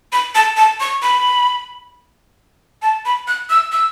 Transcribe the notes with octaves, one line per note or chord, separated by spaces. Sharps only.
B5
A5
A5
C#6
B5
A5
B5
F#6
E6
E6